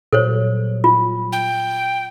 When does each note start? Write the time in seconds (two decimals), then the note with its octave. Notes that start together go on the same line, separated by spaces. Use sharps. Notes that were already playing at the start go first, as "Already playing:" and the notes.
0.13 A#2 F#3 G3 A4 C5 C#5
0.84 F4
1.32 G5